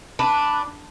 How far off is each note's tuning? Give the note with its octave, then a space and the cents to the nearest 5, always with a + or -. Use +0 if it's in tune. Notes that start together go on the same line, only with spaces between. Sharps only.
D4 +0 B4 +0